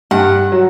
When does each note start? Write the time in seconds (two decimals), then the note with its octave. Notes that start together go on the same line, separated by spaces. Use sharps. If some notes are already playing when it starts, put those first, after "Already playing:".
0.11 G2 F#5
0.52 F#3